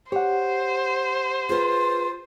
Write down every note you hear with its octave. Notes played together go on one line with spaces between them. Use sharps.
G4 C5 C#5 F#5
F4 G#4 B4